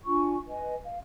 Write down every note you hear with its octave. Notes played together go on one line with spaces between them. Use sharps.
D4 F4 G#5 C#6
B4 D#5 G#5
F5